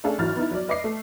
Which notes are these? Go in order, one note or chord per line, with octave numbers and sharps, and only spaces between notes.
A3 C#4 D4 G#4 A4 F5
G#1 E3 F#3 F6 A6
B3 D#4 E4
F#3 D5
B4 D#5 D6 C7
A3